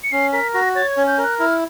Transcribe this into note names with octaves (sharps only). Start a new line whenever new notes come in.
C#7
C#4 C7
A#4 B6
F#4 A#6
C#5 A6
G#6
C#4
G6
A#4
F#6
E4 F6